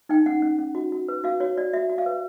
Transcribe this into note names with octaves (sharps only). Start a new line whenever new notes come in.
D#4 G5
C#4 F#5
C#4
C#4
F#4
F#4
B4
F#4 F5
F#4 C#5
F#4 D5
F#4 E5
F#4
F5
B4